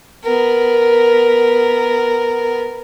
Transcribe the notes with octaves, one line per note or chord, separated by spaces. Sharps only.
B3 A#4